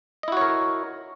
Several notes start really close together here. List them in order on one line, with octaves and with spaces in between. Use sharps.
D#5 E4 F#4 C#5 A#4